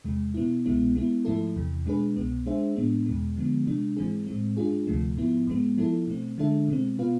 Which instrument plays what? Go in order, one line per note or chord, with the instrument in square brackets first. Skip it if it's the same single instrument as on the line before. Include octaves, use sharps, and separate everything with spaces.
[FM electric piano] E2 C3 G#3
B2 B3 E4
C2 B2 G#3 B3 E4
G#3 B3 E4
G#2 F3 A3 E4 A4
E2 C3 E3
B2 G#3 D4 G#4 B4
C2 B2 B3
G#3 D4 G#4 C5 E5
A2 G#3 B3 D4
E2 B2 G#3
D3 F3 G#3 B3
C3 G#3 D4
G#2 E3 G#3 C4 G#4
A2 G#3 C4
G#2 G#3 D4 F4 G#4
D2 C3 F3 A3
G#2 F3 B3 E4
G#2 G#3 B3
F3 B3 E4 A4
B2 A3 C4
D3 G#3 D4 A4 E5
B2 G#3 C4
B2 B3 F4 B4 F5